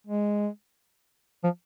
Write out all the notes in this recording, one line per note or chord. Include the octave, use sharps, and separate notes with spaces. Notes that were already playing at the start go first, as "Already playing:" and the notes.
G#3
F3